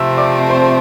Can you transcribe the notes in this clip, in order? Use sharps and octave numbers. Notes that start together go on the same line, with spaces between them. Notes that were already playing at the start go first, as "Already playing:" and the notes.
Already playing: C3 F3 A3 C4 E5 E6
D5 D6
C5 C6